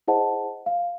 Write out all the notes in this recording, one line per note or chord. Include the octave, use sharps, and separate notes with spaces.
E4 G#4 C5 D#5 F#5 A5
F5